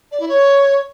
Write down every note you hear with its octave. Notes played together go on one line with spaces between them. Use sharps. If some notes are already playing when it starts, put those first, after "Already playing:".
D5
E4
C#5